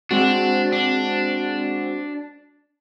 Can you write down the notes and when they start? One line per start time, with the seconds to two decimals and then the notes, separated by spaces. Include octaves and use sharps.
0.11 G#3 C4 D4 F#4
0.73 D4